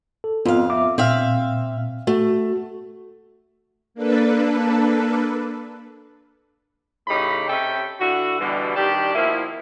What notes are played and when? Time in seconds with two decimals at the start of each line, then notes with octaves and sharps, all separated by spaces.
0.24 A4
0.45 F2 B3 C4 F4 F5
0.70 E5 D6
0.98 A#2 C4 E5 F5
2.07 A3 F#4
3.94 A#3 D4 A4 B4
7.08 A2 C#3 D#4 G4 B5
7.49 C3 C#4 A4 E5 G5
8.00 D3 E4 F#4
8.40 B2 D3 E3 G3
8.76 D#3 G3 D4 G4
9.14 B2 F3 A#3 E4